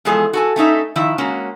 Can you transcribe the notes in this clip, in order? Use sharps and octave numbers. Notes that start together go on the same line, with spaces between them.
E2 F3 G#3 G#4 A4 G#5
F#4 A4 G#5
A3 C#4 D#4 E5
D#3 F3 E4 E5
G#3 A#3 C#4 F#4